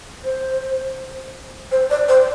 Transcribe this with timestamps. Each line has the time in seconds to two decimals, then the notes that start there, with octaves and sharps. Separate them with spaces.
0.24 C5
1.72 C5
1.91 D5
2.08 C5